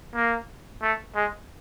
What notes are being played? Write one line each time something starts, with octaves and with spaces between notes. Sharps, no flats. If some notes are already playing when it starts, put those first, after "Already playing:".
A#3
A3
G#3